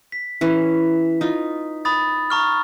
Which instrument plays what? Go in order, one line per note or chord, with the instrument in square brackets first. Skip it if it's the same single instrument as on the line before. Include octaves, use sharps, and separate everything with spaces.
[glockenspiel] B6
[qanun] E3 C#4
D#4 F4
[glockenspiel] B5 D#6 A6
A#5 C#6 F6